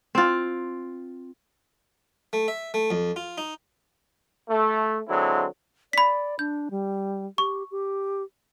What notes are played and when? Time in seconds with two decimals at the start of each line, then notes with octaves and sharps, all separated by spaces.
0.15 C4 F4
2.33 A3
2.48 E5
2.74 A3
2.91 F2
3.16 F4
3.38 D#4
4.49 A3
5.08 D3 F#3 G#3 C4 E4
5.93 D5 B5 B6
6.39 D4 G6
6.71 G3
7.38 G4 C#6
7.71 G4